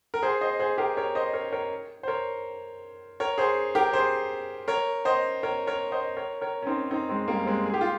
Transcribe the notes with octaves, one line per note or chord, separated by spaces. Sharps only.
A#4
G#4 C5
C5 D#5
G#4 C5
G4 A#4
A#4 C#5
C5 D#5
A#4 C#5
A#4 C#5
C5
A#4 C#5
A#4 C#5
G#4 C5
G4 A#4
G#4 C5
A#4 C#5
C5 D#5
A#4 C#5
A#4 C#5
C5 D#5
A#4 C#5
A#4 C#5
C#4
C4 D#4
C4 D#4
G#3 C4
G3 A#3
G#3 C4
G#4
G4
F4